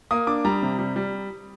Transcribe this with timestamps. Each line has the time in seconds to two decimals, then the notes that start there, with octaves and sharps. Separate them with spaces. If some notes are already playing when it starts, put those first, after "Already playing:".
0.11 A#3 D#6
0.27 D4 D6
0.45 G3 A#5
0.62 C3
0.79 G3
0.96 G3